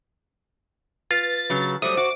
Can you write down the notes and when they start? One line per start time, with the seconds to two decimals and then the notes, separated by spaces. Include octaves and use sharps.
1.11 F4 B4 A6
1.50 C#3 F#3
1.82 F#3 G3 A3 C5 D#6
1.97 F#4 D6